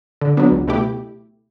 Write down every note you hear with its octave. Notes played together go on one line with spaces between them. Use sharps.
D3
F#3 B3 D4
C#2
B2 A3 E4 G4